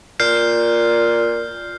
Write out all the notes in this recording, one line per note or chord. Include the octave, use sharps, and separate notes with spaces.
A#2 F6 G6 C7